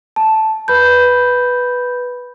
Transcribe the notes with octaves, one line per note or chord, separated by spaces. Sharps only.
A5
B4 B5 G6